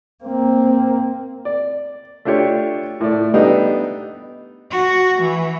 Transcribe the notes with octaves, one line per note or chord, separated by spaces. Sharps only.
A#3 C4
D5
A3 D4 F4 G4 C#5
A2 A3 D5
G3 A3 B3 D4 D#4 G4
F#4
E3